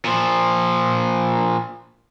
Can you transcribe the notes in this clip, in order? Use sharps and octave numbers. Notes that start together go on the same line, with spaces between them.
A#2 F3